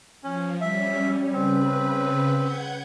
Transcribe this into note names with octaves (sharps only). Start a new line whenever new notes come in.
F3 C#4
G3 C#4 E5
C#3 C4 B4
F#5 G6 G#6